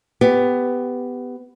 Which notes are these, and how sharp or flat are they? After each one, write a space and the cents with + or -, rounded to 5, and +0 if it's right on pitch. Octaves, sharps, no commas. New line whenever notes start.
B3 +15 G4 +10